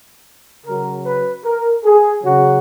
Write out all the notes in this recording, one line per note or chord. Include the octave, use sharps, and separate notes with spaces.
C#3 F#3 A#4
B4
A#4
G#4
C#3 F#3 F#4